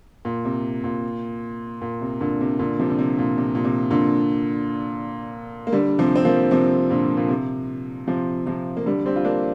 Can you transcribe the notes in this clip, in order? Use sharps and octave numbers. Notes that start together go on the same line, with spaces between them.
A#2
C3
A#2
A#2
C3
A#2 D3
C3
A#2 D3
C3 F3
D3
C3
A#2
C3
A#2
C3
A#2 D3
A#3
D3 G3
C3 F3
C4
F3 A#3
C3 F3
A#2 D3
A#2
C3
C3 F3
C3 F3
A#3
D3 G3
G3 C4
F4
A#3 D4